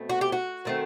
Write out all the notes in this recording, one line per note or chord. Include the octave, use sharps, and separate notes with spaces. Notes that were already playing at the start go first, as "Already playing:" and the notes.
Already playing: B2 A3 C4
F#4
G4
F#4
D#3 A3 C4